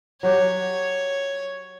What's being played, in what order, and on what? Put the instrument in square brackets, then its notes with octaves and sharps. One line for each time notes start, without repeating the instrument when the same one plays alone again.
[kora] F#3 F#4 G4 [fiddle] C#5